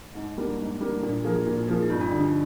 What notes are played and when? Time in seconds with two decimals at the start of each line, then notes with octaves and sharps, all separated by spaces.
0.15 G#2 D#4
0.38 G3 A#3 D4
0.60 G#2
0.81 G3 A#3 D4
1.03 A#2 D4
1.24 F3 A#3 F4 G#4
1.46 A#2
1.68 F3 A#3 F4 G#4
1.83 D#4
1.90 G2 F4
2.01 D4
2.11 D3 G3 D4
2.23 D#4